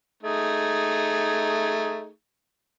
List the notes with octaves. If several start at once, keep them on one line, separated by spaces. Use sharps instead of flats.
A3 D#4 G#4